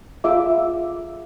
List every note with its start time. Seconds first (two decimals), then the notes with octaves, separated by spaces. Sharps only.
0.24 F4 G#4 E5 D6